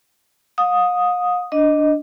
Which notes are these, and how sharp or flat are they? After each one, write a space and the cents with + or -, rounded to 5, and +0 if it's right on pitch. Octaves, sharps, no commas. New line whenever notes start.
F5 +45 D#6 +0
D4 +0 D#5 -5